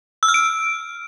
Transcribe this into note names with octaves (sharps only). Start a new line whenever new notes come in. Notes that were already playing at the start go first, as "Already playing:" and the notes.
E6
F6
D7